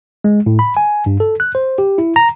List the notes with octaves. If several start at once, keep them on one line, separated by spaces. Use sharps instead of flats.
G#3
A2
B5
G#5
G2
A4
F#6
C5
G4
E4
A#5